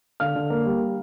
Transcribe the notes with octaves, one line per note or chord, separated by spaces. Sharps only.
D3 F5 F6
D3
A#3
G3